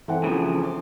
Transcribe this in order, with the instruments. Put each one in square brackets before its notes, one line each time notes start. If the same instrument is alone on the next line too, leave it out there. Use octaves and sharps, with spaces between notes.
[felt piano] E3 F#5 [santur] C4 A4 G5
[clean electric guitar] C#3 F3 [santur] A3
[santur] C6 D6